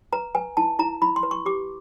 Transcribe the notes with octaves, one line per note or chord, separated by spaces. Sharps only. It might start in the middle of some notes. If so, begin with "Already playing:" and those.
B4 A#5
B4 G#5
E4 A5
E4 A#5
E4 B5
C6
B4
C#6
G4 D6